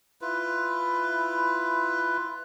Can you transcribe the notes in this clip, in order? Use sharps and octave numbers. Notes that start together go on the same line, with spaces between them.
E4 F4 B4